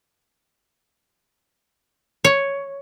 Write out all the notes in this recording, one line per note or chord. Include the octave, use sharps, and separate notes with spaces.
C#5